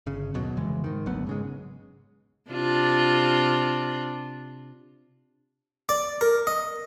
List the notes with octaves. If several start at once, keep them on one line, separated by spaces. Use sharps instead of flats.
G1 C#3
D#2 B2 F#3
F1 C#3 E3 G#3
G#2 D#3
G#1 D2 F#3 B3
G#2 C#3 G#3
C3 D4 F4
D5
A#4
D#5